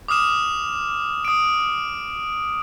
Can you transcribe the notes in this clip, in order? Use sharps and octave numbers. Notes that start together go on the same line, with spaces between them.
D6 D#6 F6 E7
D#6 D7